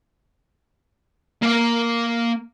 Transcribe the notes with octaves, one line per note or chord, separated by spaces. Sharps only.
A#3 F5